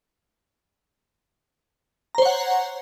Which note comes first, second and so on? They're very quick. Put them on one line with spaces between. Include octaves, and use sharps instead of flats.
A#5 C5 C#5 F#5